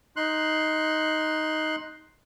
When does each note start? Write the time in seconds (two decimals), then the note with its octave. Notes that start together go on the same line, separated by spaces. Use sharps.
0.16 D#4 C6 F#6